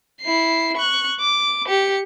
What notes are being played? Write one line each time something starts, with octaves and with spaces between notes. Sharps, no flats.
E4 C7
C#6 F#6
D6
G4 C#7